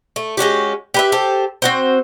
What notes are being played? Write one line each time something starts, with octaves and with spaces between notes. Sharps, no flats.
A3
G#3 C#4 F#4 G4
G4 B4 E5
G4 A4 C5
C4 F#4 C5